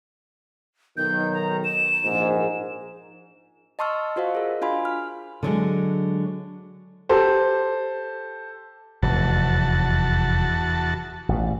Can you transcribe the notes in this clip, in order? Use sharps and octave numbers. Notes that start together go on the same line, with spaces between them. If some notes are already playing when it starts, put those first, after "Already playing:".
B1 D#3 G6
A#5
E7
A#1 G#2
D#5 A5 C6 C#6 E6 F6
F4 F#4 C5 D#5 F5
G#4 A#4
D4 F4 F5 G#5 B5 C6
F6
D3 F#3 G#3
G4 A4 C5
F1 E2 G#2 F#4 A5
A1 B2